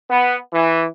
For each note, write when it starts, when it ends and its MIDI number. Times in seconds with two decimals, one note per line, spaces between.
0.10 0.37 59
0.53 0.86 52